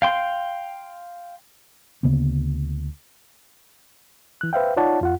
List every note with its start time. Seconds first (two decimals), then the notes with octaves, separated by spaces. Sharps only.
0.02 F5 G5 C6
2.03 D2 C#3 A#3 B3
4.41 E3 F#6
4.53 B4 C5 E5 F5 G5
4.77 D#4 F4 C#5 D5 F#5 A5
5.01 F2 F4 F#5